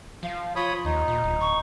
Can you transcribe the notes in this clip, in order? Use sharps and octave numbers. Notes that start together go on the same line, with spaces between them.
F3 F5
F4 C#5 B5 D#6
D#2 D#4
A#2
D1
C#6